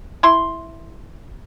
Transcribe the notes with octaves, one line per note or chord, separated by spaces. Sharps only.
E4 C6